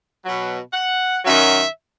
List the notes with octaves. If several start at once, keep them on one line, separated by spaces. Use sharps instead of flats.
B2 F#3
F#5
F#2 D#3 F#3 E5